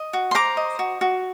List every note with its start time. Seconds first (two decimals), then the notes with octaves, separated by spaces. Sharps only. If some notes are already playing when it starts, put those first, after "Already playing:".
Already playing: D#5
0.13 F#4
0.31 C6
0.35 C5 A#5 D6
0.57 D#5
0.79 F#4
1.01 F#4